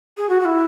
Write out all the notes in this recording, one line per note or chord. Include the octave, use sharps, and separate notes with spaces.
G#4
F#4
F#4
E4